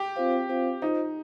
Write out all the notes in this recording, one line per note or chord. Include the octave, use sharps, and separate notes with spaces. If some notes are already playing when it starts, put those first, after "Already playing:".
Already playing: G4
C4 F4 C5 F5
C4 F4 C5 F5
D#4 F4 C5 D#5